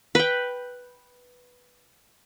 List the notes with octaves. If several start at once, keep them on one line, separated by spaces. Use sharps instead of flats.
B4 G5